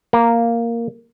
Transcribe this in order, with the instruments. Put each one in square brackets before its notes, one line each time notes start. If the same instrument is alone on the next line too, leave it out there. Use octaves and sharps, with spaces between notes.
[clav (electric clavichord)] A#3